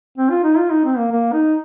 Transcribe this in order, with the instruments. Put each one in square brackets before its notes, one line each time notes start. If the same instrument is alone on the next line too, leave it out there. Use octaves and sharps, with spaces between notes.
[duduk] C4
F4
D#4
F4
D#4
C4
A#3
A#3
D#4